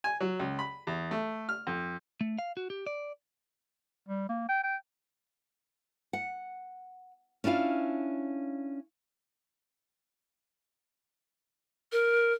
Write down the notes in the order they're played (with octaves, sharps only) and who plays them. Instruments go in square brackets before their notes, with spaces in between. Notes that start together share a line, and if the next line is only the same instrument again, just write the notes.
[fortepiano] G#5
F#3
C#2
B5
E2
A3
F6
F2
[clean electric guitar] A3
F5
F#4
G4
D5
[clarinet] G3
A#3
G5
G5
[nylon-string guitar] F#5
C#4 D4 E4 F4 F5
[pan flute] A#4